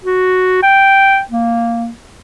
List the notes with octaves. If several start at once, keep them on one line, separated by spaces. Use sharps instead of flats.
F#4
G5
A#3